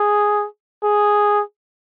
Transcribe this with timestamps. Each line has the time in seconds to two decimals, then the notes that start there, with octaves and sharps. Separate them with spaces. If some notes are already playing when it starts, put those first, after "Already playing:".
Already playing: G#4
0.84 G#4